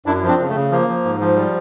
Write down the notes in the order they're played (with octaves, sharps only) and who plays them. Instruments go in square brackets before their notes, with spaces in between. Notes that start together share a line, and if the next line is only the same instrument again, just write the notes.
[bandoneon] F#2 D4 E4
F3
C4 D4
C#3
A3
C#3
F3 A#3
F3
G#2
F3
G3